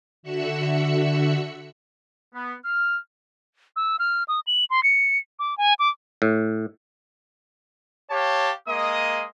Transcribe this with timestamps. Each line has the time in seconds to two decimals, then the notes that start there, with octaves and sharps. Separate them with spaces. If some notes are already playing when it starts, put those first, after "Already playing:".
0.23 D3 F#4 E5 E6 F#6 C#7
2.34 B3
2.64 F6
3.76 E6
3.99 F6
4.28 D#6
4.47 F#7
4.70 C6
4.83 C#7
5.39 D6
5.58 G#5
5.79 D6
6.22 A2
8.11 G4 C#5 F5 A5
8.68 G#3 A#3 D#5 D#6